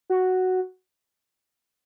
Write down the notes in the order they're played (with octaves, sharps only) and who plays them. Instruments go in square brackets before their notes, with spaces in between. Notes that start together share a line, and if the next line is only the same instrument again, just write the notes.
[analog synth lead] F#4